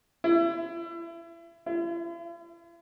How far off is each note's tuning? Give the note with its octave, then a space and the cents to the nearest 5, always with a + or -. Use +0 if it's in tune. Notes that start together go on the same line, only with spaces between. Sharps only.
E4 +30
E4 +45